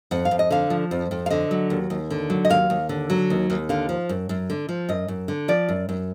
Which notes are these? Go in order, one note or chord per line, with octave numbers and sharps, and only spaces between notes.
F2 F#5
F5
F2
D#5
D3 F5
F3
F2
F2
F5
D3 D#5
F#3
D#2
D#2
D3
F#3
D#5
D#2 F5
D#2
D3
F#3
D#2
D#2
D3 F5
F3
F#2
F#2
D3
F3
F#2 D#5
F#2
D3
F3 D5
F#2
F#2